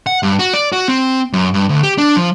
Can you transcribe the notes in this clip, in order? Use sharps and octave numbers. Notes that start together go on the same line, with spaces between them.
F#5
G2
F#4
D5
F#4
C4
F#2
G2
D2
G4
D4
F3